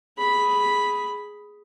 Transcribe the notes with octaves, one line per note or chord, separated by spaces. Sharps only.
G#4 B5